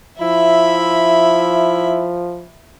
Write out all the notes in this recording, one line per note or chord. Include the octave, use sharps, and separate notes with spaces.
F3 E4 E5 B5